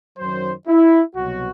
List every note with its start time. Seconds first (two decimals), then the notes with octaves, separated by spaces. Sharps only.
0.17 F#2 D#3 F#3 C5
0.67 E4
1.15 C2 B2 F#3 F#4